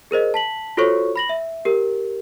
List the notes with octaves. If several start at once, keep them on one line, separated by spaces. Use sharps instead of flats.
G#4 A#4 C5 D#5
A5 B6 F#7
F4 F#4 A4 C5 C#5 C#6
B5 A#6 F#7
E5
G4 A#4